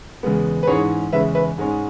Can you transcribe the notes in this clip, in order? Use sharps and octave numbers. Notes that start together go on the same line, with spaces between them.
E2 C#3 G#3 B3
B4
G#2 E3 C#4 G#4 C#5
E2 C#3 G#3 C#4 B4 E5
B4 E5
G#2 G#3 C#4